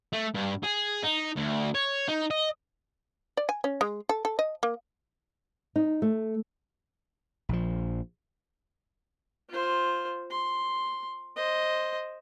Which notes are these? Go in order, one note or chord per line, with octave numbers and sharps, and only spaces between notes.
A3
G2
G#4
D#4
D2
C#5
D#4
D#5
D5
G#5
C#4
G#3
A4
A4
D#5
A#3
D#4
A3
A#1 F3
F4 C5
C6
C5 D#5